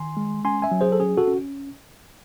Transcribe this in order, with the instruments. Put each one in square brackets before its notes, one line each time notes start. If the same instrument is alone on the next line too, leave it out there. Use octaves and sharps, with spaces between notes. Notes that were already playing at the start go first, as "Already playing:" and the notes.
Already playing: [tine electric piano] D#3 G#5 C6
G#3
C#4 G#5 C6
E5 G#5
F#3
G#4 C5
A4
C#4 G#4
F#4 A4
C#4